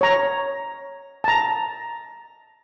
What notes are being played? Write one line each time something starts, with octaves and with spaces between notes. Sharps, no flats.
C#5 A#5
A5 A#5